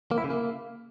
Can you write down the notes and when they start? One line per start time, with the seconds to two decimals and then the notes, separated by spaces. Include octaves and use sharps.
0.11 A#3
0.18 E4
0.24 C#3
0.30 A#3